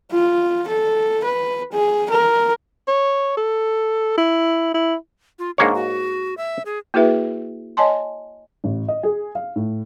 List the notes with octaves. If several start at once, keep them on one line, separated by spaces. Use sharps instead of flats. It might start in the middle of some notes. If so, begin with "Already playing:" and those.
F4
A4
B4
G#4
A#4
C#5
A4
E4
E4
F4
G#2 A#3 D4 C#5
F#4
E5
G#4
A#3 E4 F#4 G#4 B4 E5
C#5 D#5 G#5 A5 C6
A1
D#5
G#4
F5
A2